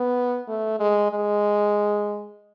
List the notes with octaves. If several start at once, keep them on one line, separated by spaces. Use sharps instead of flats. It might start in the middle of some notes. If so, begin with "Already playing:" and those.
Already playing: B3
A3
G#3
G#3